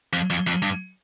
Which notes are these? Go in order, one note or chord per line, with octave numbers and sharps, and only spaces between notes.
F2
F2
F2
G2